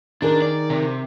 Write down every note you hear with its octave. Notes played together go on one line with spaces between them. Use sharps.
D#3 D4 G#4 A#4
D5
C3